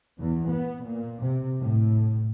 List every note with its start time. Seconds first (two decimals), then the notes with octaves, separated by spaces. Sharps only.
0.19 E2
0.52 B3
0.83 A#2
1.22 C3
1.60 A2